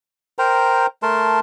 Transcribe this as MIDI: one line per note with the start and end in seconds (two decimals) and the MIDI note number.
0.39 0.86 70
0.39 0.86 72
0.39 0.86 79
0.39 0.86 82
1.03 1.40 57
1.03 1.40 70
1.03 1.40 81
1.03 1.40 84